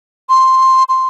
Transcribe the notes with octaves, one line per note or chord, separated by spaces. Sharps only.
C6
C6